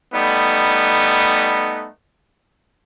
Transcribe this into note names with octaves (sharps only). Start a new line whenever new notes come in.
G3 A3 B3 D#4